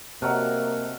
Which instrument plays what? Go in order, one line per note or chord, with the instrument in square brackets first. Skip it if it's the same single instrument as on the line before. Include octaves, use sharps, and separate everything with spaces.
[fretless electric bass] C3 [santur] F#3 A3 [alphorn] A#3 [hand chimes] D#5 F6 F#6